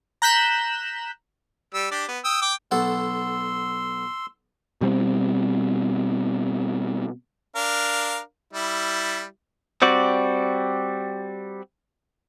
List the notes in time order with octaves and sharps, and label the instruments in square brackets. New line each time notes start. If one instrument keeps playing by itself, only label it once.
[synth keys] A#5 F#6 G6 B6 E7
[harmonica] G3 E6
D4 G4 D5
B3
G5 D#6 E6
G5 D6
[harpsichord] B1 A4 F#5 [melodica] C6 E6
[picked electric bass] B2 G3 B3 C4
[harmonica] D4 A#4 F5
G3 E4
[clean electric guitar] G3 C4 F#4 D5